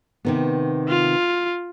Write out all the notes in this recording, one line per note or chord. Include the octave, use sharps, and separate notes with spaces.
C3 D#3 B3
F4